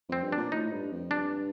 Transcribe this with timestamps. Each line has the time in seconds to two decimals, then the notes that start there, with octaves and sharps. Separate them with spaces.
0.09 F2 C4
0.23 G2
0.32 A#2 D4
0.52 A2 D#4
0.71 G2
0.91 F2
1.11 G2 D4